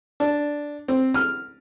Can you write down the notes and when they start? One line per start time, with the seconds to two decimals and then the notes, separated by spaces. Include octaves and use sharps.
0.20 D4
0.88 C4
1.14 F6